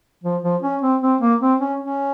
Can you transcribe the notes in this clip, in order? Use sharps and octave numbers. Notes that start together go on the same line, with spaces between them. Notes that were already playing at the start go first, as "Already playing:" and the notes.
F3
F3
C#4
C4
C4
A#3
C4
C#4
C#4